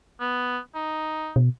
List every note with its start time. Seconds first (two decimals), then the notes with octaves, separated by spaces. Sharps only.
0.20 B3
0.75 D#4
1.36 B2